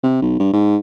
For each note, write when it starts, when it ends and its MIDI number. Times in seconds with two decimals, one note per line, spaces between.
0.03 0.20 48
0.22 0.35 35
0.39 0.48 43
0.53 0.77 44